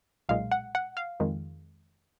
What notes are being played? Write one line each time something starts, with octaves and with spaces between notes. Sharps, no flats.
B1 A#2 G#3 F5
F#5
F#5
F5
F2 D#3 G#3